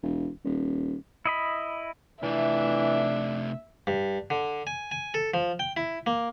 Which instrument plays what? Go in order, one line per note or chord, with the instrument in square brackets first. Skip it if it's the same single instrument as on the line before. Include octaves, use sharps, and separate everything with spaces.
[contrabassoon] E1
D#1
[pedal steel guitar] E4 D#5 B5
[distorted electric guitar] C3 A3 [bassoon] E3 [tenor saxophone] D4 [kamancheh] E5
[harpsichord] G2
D3
G#5
G#5
A4
F3
G5
E4
A#3